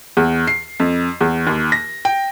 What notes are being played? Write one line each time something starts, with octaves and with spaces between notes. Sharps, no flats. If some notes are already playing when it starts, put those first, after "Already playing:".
E2
C7
F2
E2
D#2
A#6
G5